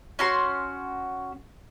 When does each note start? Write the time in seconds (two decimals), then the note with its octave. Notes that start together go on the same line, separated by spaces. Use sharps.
0.19 C#4 F#4 C6